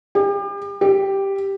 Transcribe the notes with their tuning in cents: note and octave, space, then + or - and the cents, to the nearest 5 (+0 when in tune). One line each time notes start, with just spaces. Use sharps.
G4 +35
G4 +0